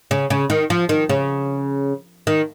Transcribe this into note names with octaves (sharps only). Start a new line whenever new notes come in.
C#3
C#3
D#3
F3
D#3
C#3
D#3